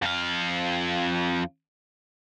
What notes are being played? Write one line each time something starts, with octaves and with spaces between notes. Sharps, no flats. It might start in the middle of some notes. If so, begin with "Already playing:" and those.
F2 F5